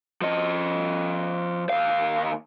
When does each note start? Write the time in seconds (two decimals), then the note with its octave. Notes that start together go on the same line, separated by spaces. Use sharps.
0.21 F3 D#5
1.69 D#2 F5